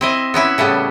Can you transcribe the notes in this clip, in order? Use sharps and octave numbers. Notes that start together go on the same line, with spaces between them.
C4 E4 D#5
B3 C#4 E4 B4
A2 C#3 G3 B3